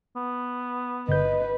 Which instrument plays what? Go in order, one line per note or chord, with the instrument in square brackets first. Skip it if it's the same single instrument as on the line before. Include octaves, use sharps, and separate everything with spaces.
[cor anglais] B3
[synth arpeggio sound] G1 G6 [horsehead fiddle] B4 [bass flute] D#5